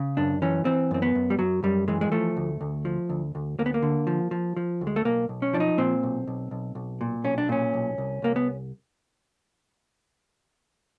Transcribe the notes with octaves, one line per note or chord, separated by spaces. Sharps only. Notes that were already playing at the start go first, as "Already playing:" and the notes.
Already playing: C#3
F#2 D4
E3 C#4
E3 C4
F#2 C4
B3
F#2
G3
F#2 F#3
F#2 G3
E3 G#3
G#3
F3 A3
D2
D2
F3
D2
D2
D2 A#3
B3
A#3
D3
F3
F3
F3
D2
G#3
A3
B1 A#3
B1
C#4
F3 D4
D#4
A#2 C4
B1
B1
B1
B1
A#2
B1 C#4
D4
A#2 C#4
B1
C2
C2 A#3
B3